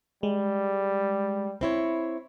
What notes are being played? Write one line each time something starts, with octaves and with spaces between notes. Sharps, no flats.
G3 G#3
C4 E4 C#5